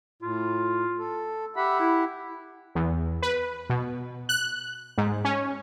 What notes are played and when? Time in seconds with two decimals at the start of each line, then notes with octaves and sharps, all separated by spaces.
0.22 A2 F4
0.98 A4
1.56 G4 E5 F#5 B5
1.79 E4
2.75 E2
3.22 B4
3.69 B2
4.29 F#6
4.98 G#2
5.25 C#4